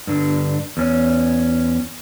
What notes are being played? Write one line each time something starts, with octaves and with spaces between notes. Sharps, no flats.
G2 D3
E2 C#4